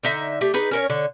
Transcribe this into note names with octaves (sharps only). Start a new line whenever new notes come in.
D3 D#4 E5
A3 G4
D#4 G#4 B4
C#4 A#4 C#5
D3 C#5